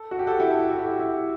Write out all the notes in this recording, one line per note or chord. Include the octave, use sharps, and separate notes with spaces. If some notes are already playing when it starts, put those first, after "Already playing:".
Already playing: A4
F#4
G4
F#4 A4
E4 G4
A4
G4
F#4
E4 G4
E4 G4